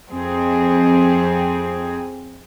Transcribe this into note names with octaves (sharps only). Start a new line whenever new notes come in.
F2 C4 G#4